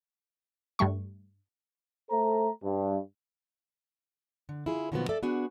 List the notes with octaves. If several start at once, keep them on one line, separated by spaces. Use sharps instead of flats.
G2 G3 A3 C#6
A3 A4 C5 A#5
G2
D3
E4 F4 G#4
B2 D#3 F3 F#3 A#3 B3
A4 D5 E5
B3 D4 F#4 G#4